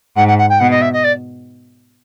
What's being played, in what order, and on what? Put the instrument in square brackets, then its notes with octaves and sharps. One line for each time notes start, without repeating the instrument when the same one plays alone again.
[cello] G#2 [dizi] F#5
[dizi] F#5
F#5
G5
[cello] B2 [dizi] F#5
[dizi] D#5
E5
D#5
D5